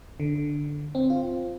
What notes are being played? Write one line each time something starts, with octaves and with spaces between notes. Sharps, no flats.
D3
C4
F4